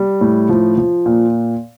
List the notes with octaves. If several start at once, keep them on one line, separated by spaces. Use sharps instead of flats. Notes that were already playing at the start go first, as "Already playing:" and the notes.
Already playing: G3
A2
F3
F3
A#2